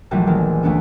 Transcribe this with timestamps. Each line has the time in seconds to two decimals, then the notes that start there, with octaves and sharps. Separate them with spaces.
0.11 A#1 E3 F#3 G3 A3
0.27 D#3 E3 G#3 A#3
0.63 D2 A3 B3 C#4 D4 D7